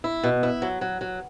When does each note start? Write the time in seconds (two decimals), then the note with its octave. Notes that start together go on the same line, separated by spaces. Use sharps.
0.04 E4
0.24 B2
0.43 E4
0.62 F#3
0.81 F#3
1.01 F#3